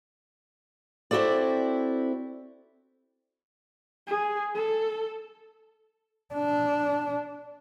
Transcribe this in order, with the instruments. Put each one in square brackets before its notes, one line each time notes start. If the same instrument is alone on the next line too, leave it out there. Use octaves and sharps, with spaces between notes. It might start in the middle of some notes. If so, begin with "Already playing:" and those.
[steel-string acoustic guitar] C4 E4 F#4 A4 D5
[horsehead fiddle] G#4
A4
[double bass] D4